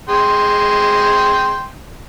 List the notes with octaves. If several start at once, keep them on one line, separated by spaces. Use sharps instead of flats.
G#3 G5 C6